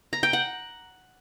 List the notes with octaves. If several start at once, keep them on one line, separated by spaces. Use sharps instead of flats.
A#5
G5
F#5